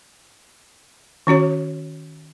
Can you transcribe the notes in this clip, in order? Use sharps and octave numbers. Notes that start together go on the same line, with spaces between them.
D#3 C#4 F#4 C#5